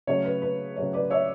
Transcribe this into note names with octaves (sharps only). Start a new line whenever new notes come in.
C#3 F#3 A3 C#5
B4
B4
C#3 F#3 A3 C#5
B4 D5
C#5 E5